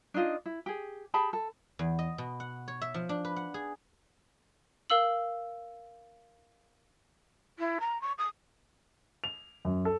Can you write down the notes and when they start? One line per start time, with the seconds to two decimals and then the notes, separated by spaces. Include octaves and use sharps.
0.14 D4 D#4 F4 D#5
0.46 E4
0.66 G4 G#4
1.14 G4 G#4 A5 B5
1.33 A4
1.79 E2
1.99 D#5
2.18 B2
2.40 F#5
2.68 C#5
2.81 E5
2.94 F3
3.09 D4
3.25 B4
3.36 F#5
3.54 G#4
4.90 A#4 F5 E6 F#7
7.58 E4
7.80 A#5
8.01 C#6
8.18 D#6
9.24 F7
9.65 F#2
9.85 A4